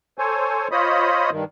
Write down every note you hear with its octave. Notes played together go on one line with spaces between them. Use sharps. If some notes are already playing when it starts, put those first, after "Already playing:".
A4 C5 C#5 G#5
F4 C5 C#5 D#5 B5 D#6
G2 D#3